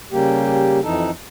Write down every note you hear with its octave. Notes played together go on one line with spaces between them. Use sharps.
C#3 G3 A#3 G4
F2 E3 D#4 A4